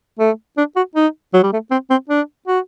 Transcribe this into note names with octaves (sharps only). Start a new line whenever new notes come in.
A3
D4
F#4
D#4
F#3
G3
A3
C4
C4
D4
F#4